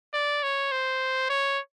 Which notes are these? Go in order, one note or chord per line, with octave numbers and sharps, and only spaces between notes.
D5
C#5
C5
C#5